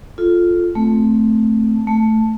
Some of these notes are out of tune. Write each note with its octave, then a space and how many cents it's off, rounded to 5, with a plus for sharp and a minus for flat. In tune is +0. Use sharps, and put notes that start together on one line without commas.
F4 +0 A4 -5
A3 +0 C4 +0
A3 +0 A5 +0